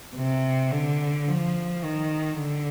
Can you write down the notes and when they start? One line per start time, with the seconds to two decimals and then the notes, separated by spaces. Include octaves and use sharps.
0.16 C3
0.71 D3
1.27 F3
1.83 D#3
2.39 D3